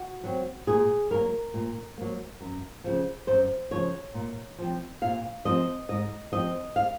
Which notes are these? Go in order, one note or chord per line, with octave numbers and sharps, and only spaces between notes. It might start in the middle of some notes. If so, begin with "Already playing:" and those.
Already playing: F#4
F#3 C4
A#2 G#4
F#3 A#3 A#4
A#2
F#3 A#3
F#2
C#3 F3
F#2 C5
C#3 F3 C#5
A#2
F3 C4
A#2 F5
F3 C4 D#5
G#2 D#5
F3 C4 D#5
F5